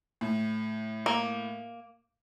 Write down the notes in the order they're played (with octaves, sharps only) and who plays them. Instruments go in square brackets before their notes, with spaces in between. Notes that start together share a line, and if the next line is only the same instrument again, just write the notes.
[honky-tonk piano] A2
[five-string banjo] A#3